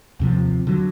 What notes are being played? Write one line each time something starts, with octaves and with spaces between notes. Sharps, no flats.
D#2 C3 F3
D3 F#3